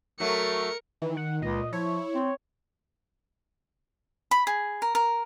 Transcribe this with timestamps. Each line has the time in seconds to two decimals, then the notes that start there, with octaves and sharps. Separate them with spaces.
0.20 F#3 A3 A#4 C#7
1.02 D#3 E3
1.17 F#5
1.42 C#2 A#2 D#5
1.73 F3 E4 C#5
2.15 C4
4.31 B5
4.47 G#4
4.82 A#4
4.95 A#4